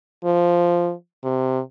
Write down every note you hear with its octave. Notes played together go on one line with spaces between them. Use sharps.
F3
C3